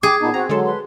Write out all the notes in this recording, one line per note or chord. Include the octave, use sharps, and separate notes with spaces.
G#4 G5 D6
A#2 B3 D#4 A5
C4 F#4 F#5 A#5
D3 F#3 G#3 A4 C6
B4 C6